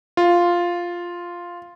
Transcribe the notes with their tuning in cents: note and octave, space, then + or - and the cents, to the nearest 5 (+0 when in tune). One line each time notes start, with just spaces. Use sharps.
F4 +0